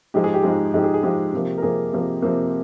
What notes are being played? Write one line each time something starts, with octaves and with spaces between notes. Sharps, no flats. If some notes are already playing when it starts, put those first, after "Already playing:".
G#2 F3 G#3 G4
G#4
G4
G#2 F3 G#3
G#2 F3 G#3 G4
G#4
G#4
G#2 F3 G#3 G4
C3 F3 A#3
A#4
C3 F3 A#3 G#4
C3 F3 A#3
C3 F3 A#3